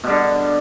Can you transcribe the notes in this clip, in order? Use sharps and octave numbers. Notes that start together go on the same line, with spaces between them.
B2 D3 G3